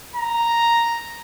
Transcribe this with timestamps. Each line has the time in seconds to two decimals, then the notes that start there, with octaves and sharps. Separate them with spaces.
0.16 A#5